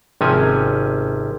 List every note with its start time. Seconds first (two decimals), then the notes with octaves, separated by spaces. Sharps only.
0.21 G#1 C3 F3 C#4 G#5